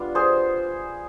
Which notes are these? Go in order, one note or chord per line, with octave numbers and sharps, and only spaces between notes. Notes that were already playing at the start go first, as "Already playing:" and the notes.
Already playing: G3 B3 D4 F4
G#4 C5